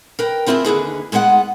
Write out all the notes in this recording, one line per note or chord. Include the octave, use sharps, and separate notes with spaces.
A#4 B4 G5
B3 C4 E4 F4 G4 G#4
D#2 D3 G#4 B4
G#2 G#3 B3 D#5 F#5